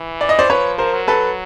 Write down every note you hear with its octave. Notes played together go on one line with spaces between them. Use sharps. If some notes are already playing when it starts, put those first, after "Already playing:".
Already playing: E3
D5
D#5
C5 D5
F3 B4 C#5
A#4 C5
F#3
A4 B4